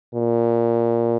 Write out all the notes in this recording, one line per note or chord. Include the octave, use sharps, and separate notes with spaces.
A#2